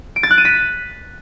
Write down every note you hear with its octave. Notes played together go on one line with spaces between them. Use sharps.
D7
A6
F#6
D#7
B6